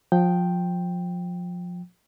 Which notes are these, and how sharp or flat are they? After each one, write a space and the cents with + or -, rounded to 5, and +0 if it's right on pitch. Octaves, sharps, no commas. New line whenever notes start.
F3 +25 G5 +0